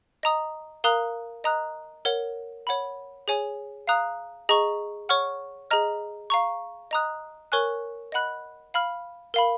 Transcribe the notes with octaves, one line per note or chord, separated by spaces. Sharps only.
D#5 A#5 D#6
A#4 F5 A#5 D#6 F#6
D#5 A#5 D#6 F#6
A#4 C#5 F#5
C#5 F#5 B5
G#4 C#5 G#5
F5 A#5 D#6 F#6
G#4 D#5 A#5 C#6
C#5 F#5 C#6 F6
G#4 D#5 A#5 F6
F5 A#5 C#6
D#5 A#5 D#6 F#6
A#4 C#5 G#5 C#6 F#6
D#5 F#5 B5 F#6
F5 B5 F6
A#4 F5 B5